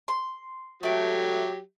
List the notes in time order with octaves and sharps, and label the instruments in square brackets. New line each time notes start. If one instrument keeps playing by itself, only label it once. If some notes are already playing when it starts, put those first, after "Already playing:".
[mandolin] C6
[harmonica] F#3 G4 [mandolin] A3 G5